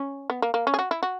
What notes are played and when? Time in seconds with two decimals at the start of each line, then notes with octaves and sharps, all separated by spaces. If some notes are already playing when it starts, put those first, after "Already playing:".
Already playing: C#4
0.30 B3
0.42 A#3
0.54 A#3
0.67 C#4
0.74 G#4
0.79 F#4
0.91 E4
1.03 F#4